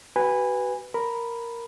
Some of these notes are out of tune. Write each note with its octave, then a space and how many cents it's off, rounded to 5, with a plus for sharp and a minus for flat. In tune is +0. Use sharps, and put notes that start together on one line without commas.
F#4 +40 B4 +0 G#5 -20
A#4 +0 B5 +0